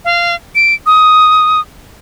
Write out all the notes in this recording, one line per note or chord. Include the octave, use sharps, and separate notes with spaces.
F5
D7
D#6